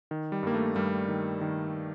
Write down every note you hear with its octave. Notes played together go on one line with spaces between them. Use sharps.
D#3
G3
G2 A#3
A3
G2 G3 A#3
D#3
D#3